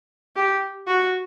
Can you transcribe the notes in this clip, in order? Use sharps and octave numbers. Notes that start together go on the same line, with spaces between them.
G4
F#4